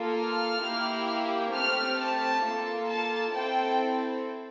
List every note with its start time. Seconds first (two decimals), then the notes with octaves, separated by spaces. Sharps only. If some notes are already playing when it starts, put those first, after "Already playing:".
Already playing: A#3 F4 A4
0.15 F6
0.60 A#3 E4 G4
1.53 A3 C4 G4 F6
1.98 A5
2.44 A#3 F4 A4
2.89 A5
3.35 C4 E4 A4 G5